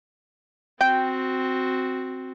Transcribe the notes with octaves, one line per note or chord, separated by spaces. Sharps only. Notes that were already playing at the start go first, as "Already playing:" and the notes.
C4 F#4 G5